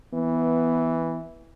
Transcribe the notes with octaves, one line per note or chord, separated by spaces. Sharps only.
E3 B3